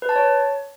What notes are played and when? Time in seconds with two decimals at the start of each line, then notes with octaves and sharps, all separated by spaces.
0.02 B4
0.09 A5
0.16 C#5